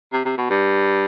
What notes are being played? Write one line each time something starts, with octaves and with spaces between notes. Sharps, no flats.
C3
C3
B2
G2